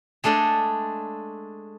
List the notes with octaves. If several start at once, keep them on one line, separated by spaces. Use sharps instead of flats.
G#3 A3 D4 A4 D#5